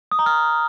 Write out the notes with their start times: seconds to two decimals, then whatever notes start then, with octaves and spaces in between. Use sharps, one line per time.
0.12 D#6
0.19 A#5
0.26 F6